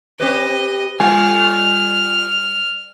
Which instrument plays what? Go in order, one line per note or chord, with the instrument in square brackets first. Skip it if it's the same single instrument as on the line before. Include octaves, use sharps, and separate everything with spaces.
[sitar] C4 G4 B4 [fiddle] D#5
[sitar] G3 [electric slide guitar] F4 G#5 [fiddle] F6